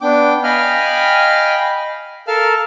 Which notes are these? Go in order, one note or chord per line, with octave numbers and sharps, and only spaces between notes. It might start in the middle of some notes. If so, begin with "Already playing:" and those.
B3 D4 G5 D6
D#5 F5 G5 G#5 B5 F6
A4 A#4 F5 A5 F6